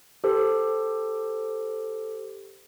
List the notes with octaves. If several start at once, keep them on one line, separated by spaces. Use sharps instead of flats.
G4 A4 C5